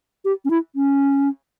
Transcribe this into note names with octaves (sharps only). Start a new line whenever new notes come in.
G4
C#4
E4
C#4